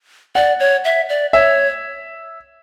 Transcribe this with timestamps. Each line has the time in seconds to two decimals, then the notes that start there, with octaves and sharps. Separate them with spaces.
0.35 D5 F#5
0.60 C#5
0.84 E5
1.09 D5
1.33 C#5 E5